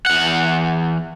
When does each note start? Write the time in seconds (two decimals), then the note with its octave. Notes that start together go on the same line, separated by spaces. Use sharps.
0.06 E2 F#5